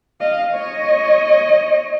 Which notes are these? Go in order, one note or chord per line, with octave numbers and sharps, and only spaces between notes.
D#5 F5
C#5 D#5